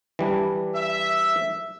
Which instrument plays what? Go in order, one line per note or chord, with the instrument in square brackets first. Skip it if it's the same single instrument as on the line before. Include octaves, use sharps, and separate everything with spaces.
[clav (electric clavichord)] E3 G3 D4
[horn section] E5